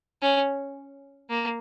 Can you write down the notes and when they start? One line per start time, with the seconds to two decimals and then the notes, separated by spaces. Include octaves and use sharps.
0.22 C#4
1.30 A#3